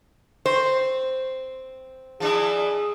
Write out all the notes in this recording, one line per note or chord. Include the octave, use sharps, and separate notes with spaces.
C4 C5
F3 D4 E4 G#4